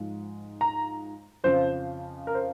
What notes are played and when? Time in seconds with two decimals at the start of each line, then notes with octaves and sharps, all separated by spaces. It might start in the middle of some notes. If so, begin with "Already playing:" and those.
Already playing: G#2 F3 G#3
0.61 A#5
1.44 F2 C#3 F3 C5
2.27 A#4
2.35 C5